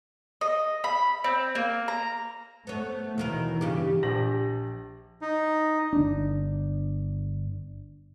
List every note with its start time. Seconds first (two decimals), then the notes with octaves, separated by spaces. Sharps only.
0.41 D#5
0.84 B5
1.24 C4
1.55 A#3
1.88 A#5
2.67 A3 B3 C#5
3.18 D#2 B2 D#3 E3 A#4
3.61 G2 C#3 G4
4.03 A#1 G4 A#6 F#7
5.21 D#4
5.93 G1 D4